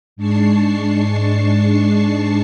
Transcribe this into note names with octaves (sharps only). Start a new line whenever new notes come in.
G#2 G#3 D4 A5 C#6 C7